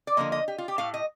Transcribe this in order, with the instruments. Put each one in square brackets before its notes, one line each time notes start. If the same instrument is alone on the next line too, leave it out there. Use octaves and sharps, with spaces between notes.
[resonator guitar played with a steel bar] D5
D3 F3 A#3 D#5
D#5
G4
F4
G4
A2 A3 F5
D#5